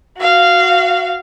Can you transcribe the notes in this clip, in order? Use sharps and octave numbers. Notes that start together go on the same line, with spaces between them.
F#4 F5